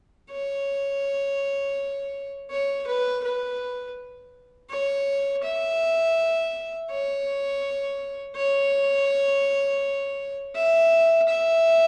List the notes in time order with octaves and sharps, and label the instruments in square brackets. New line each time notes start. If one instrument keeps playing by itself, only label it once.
[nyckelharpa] C#5
C#5
B4
B4
C#5
E5
C#5
C#5
E5
E5